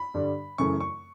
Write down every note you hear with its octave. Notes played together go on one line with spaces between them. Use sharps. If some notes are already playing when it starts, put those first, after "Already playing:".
Already playing: B5
G2 D3 G3
F#2 C#3 E3 A3 C#6
C#6